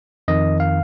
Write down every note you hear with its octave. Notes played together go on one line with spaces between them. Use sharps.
F2 D#3 D#5
F5